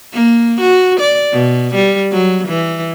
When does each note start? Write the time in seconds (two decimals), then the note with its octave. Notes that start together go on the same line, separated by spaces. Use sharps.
0.13 A#3
0.61 F#4
1.00 D5
1.33 B2
1.75 G3
2.12 F#3
2.48 E3